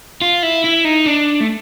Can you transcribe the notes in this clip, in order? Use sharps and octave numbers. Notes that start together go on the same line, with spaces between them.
F4
E4
E4
D#4
D4
A3